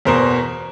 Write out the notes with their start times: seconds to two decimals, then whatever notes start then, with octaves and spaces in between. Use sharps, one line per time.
0.05 E2 B2 A#4 C5